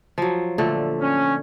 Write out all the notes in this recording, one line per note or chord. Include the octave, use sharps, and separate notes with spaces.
F3 F#3
A#2 D3 A3
C#4